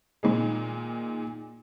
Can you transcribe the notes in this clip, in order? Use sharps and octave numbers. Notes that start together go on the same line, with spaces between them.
A#2 D#3 G#3